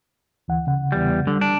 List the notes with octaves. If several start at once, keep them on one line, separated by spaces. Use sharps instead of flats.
D2 E3 F#5
C#3 F#5
E2 G3
D3 G3
D4